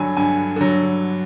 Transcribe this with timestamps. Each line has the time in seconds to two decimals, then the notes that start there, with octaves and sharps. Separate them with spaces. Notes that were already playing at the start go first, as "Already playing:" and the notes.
Already playing: G2 D3 F#3 G#5 B5
0.17 G2 G#5
0.56 D3 F#3